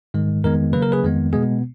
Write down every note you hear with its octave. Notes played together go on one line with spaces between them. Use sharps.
G#2 D#3 G#3
F2 D#3 G#3 B3 A#4
C#3 F#3 A#3 B4
A#4
G#4 B4
F2 D#3 G#3 B3
B2 G#3 B3 G#4